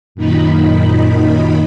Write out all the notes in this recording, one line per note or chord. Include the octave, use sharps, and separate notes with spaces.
F#2 A#2 D#3 D#4 B5